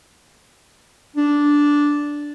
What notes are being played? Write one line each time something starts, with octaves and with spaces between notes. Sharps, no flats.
D4